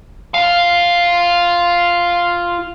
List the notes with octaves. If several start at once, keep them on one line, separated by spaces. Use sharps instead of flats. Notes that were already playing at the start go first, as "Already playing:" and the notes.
F4 F5